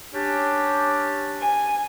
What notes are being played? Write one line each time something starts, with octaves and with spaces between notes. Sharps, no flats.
C#4 D4 G4
G#5